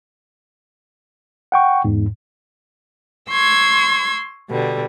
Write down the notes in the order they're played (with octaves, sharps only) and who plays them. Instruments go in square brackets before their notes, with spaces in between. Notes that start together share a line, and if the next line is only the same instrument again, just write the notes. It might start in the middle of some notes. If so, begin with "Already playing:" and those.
[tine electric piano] F#5 G5 C#6
E2 G#2
[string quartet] C6 C#6 E6 G#6
B2 D3 G3